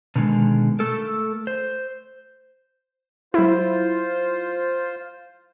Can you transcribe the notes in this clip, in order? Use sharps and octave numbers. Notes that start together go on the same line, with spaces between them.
B2 D3 D#3 F3 G#3
A3 A4 A#4
C5
F#3 E4 F4 C5